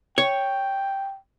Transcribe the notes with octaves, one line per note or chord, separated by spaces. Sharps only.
C#5 G5